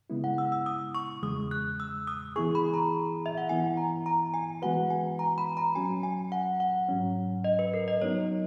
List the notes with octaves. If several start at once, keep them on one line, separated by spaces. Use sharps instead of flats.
C#3 G#3 B3 E4
F#5
E6
E6
D#6
C#6
E2 C#3 G#3 D#6
F#6
E6
D#6
E3 B3 E4 G#4 C#6
B5
A#5
E5
F#5
E3 B3 E4 G#5
A#5
A#5
G#5
E3 G#3 B3 F#4 B4 F#5
G#5
A#5
B5
A#5
F#3 C#4 F#4 G#5
G#5
F#5
F#5
G#2 F#3 C#4
D#5
B4
A#4
D#5
F#3 B3 D#4 C#5